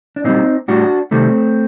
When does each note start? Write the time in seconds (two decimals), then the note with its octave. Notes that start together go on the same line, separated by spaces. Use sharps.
0.16 D4
0.24 A#2 G3 C4 D#4
0.68 A2 G3 D4 F#4
1.11 C3 D#3 G3 A3 C4